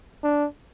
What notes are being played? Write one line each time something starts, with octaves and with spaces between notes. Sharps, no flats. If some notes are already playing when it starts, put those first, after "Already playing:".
D4